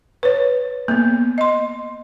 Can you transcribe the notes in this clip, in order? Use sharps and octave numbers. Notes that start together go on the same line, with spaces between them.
B4 C#5
A#3 B3
D#5 C6